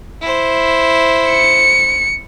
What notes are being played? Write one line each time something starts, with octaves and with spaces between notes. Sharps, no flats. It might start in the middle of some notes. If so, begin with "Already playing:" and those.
E4 C5
C#7